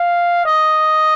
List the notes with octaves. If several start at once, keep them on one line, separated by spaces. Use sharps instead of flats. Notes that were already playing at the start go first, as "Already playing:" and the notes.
Already playing: F5
D#5